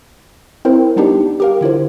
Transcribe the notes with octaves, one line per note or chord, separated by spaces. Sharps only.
C4 E4 A#4 C5
G3 B3 D4 D#4 G4
G4 A#4 F5
D3 E4 F4 C5